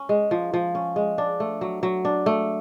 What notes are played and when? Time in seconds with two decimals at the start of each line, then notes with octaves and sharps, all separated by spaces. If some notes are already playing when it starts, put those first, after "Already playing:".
Already playing: C#4
0.09 G#3
0.31 F3
0.54 F3
0.75 C#4
0.96 G#3
1.18 D4
1.40 A3
1.61 F#3
1.83 F#3
2.05 D4
2.26 A3